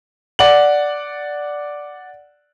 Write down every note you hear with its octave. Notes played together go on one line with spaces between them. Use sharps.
D5 F#5 F#7